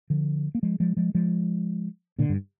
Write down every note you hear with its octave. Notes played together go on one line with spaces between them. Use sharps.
D3 F3
A#3
F3 G#3
F3 G#3
F3 G#3
F3 G#3
A#2 D3
G2